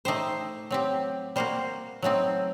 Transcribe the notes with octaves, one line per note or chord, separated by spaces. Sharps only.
A3 D#4 G4 C5
F#3 C4 G4
G3 A#3 F#4 C5
F#3 A3 C4 D#4